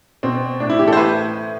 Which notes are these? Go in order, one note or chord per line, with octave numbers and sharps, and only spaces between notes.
B2 C4
A2 D4
E4
E3 G4
A4
C5
A2 B4